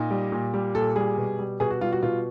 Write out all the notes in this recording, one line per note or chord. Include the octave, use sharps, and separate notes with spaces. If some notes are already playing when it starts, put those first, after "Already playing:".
Already playing: A#2 D#4
G3
A#2
G3
A#2 A4
G3 G#4
B2
G3
B2 G#4
F#4
G3 F4
F#4
B2 F4